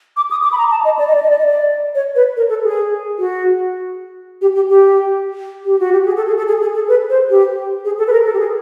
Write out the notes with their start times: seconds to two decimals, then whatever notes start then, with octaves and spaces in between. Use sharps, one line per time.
0.17 D6
0.31 D#6
0.43 D6
0.52 B5
0.58 A#5
0.71 A5
0.85 D#5
0.99 D5
1.07 D#5
1.15 D5
1.23 D#5
1.30 D5
1.39 D#5
1.46 D5
1.95 C#5
2.16 B4
2.37 A#4
2.49 A4
2.64 G#4
3.19 F#4
4.41 G4
4.55 G4
4.69 G4
5.65 G4
5.79 F#4
5.92 G4
6.06 G#4
6.17 A4
6.27 G#4
6.37 A4
6.48 G#4
6.61 G#4
6.75 A4
6.88 B4
7.10 C5
7.30 G4
7.85 G#4
7.98 A4
8.07 B4
8.12 A#4
8.25 A4
8.34 G4
8.39 G#4